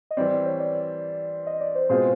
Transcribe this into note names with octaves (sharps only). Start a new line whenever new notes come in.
D#5
E3 G3 C4 D5
D5
C#5
D5
D#5
D5
C5
B2 G#3 C4 F4 G#4 C5